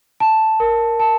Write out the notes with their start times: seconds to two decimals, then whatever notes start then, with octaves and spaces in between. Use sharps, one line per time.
0.20 A5
0.60 A#4
1.00 A5